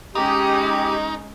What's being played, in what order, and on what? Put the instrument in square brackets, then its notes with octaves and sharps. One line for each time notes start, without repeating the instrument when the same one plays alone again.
[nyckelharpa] G#3 C#4 [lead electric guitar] D#4 [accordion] G4